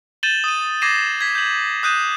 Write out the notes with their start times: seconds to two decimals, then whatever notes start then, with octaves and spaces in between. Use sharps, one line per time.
0.23 G6 A6 D#7 E7 F#7 G7
0.44 D#6 D#7
0.82 D6 G#6 A#6 C7 D#7 E7
1.21 G#6 B6
1.35 G6 F#7
1.83 D#6 F#6 G6 D#7 E7